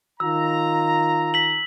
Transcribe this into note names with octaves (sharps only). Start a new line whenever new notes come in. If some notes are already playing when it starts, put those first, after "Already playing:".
D#3 F4 A#5 E6
B6 F#7